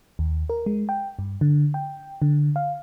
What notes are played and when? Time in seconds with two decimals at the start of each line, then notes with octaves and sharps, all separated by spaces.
0.19 D#2
0.50 A#4
0.66 G#3
0.89 G5
1.19 G2
1.41 D3
1.74 G5
2.22 D3
2.56 F5